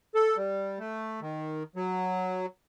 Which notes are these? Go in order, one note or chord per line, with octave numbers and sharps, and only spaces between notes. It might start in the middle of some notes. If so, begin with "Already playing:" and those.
A4
G3
A3
D#3
F#3